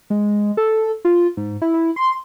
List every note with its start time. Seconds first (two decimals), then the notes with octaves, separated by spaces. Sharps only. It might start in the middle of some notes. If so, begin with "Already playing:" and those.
0.10 G#3
0.57 A4
1.05 F4
1.37 G#2
1.62 E4
1.74 E4
1.96 C6